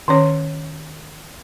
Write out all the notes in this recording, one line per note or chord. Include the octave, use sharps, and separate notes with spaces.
D#3 C#4 C#5